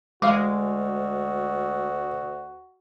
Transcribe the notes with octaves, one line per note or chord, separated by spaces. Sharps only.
D2 G#3 F#4 F5 D6